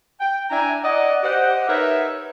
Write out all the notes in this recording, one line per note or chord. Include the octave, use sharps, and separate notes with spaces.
G5
D4 E4 D5 E5 G#5 A#5
D5 D#5 F#5
G4 C5 D#5 F#5
D#4 A#4 B4 C#5 E5